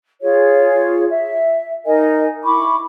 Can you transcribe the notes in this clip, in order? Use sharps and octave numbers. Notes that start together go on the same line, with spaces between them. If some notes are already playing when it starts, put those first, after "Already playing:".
F4 G#4 C#5
E5
D#4 A#4 D#5 G#5
E4 B5 C#6 D6